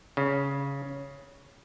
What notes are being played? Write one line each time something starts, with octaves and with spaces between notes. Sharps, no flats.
C#3